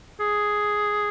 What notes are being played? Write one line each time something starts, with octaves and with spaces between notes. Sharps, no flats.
G#4